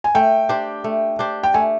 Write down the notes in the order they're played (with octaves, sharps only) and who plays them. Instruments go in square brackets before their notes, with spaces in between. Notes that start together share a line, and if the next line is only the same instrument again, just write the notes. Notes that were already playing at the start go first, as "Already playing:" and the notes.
[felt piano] G#5
[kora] A3 [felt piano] G5
[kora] D4 G4 C5
A3
D4 G4 C5
[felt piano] G5
[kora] A3 [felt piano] G#5